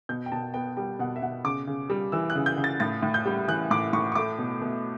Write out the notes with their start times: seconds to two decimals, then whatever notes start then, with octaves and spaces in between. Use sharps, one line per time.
0.09 B2 G6
0.26 G5
0.32 B2 A5
0.54 B3 G5
0.77 G3 G5
0.99 B2 F#5
1.16 E5
1.22 B2 F#5
1.44 C#3 D6
1.67 C#3
1.90 G3
2.12 E3 E6
2.30 F#6
2.35 C#3
2.46 G6
2.57 C#3
2.64 A6
2.80 A2 A6
3.03 A2
3.14 G6
3.25 G3
3.48 E3 F#6
3.71 A2 D6
3.93 A2 C#6
4.12 C#6
4.15 A3 D6
4.38 B2
4.61 B2